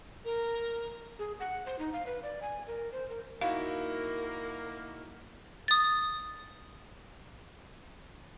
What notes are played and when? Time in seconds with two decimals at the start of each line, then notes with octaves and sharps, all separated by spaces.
0.24 A#4
1.19 G#4
1.40 F#5
1.66 C5
1.79 D#4
1.93 F5
2.07 B4
2.23 D5
2.42 G#5
2.67 A#4
2.92 C5
3.10 A#4
3.41 A#3 D#4 E4 F#4 A#4 F5
5.68 D#6 A6